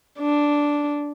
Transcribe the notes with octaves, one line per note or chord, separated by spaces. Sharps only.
D4